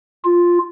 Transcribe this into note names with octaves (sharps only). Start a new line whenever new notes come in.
F4